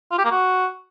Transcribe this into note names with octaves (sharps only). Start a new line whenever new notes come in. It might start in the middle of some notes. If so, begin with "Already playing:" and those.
F4
G4
A#3
F#4